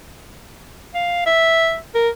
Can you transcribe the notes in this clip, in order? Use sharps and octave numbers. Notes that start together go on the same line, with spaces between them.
F5
E5
A#4